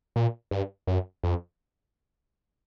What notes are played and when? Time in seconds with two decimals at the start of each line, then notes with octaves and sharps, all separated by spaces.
0.16 A#2
0.51 G2
0.87 F#2
1.23 F2